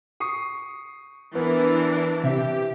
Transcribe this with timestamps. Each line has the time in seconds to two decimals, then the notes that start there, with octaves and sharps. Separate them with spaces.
0.20 C#6 D#6 C7
1.35 E3 B3 D4 A#4 B4
2.24 C3 G4 E5